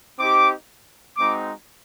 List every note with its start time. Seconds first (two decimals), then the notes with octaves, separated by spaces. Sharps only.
0.19 C4 D#4 G4 D6
1.17 G#3 C4 D#4 F#4 D6